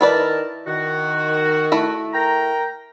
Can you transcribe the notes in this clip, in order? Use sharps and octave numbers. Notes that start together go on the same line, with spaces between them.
D#3 E4 A#4 B4 D5 A5
D#3 F#4
A3 E4
A#4 G5 A#5